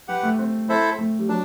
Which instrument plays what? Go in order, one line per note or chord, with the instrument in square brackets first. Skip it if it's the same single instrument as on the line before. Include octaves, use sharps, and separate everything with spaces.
[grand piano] G3 [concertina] G4 B4 F#5
[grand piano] A3
C4
[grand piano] C4 [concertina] E4 A4 C5 E5
[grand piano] A3
G3
[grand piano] F#3 [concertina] D4